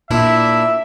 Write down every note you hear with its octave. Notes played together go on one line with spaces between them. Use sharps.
A#2 D4 E4 E5